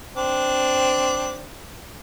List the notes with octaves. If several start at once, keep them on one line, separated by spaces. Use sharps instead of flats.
C4 D4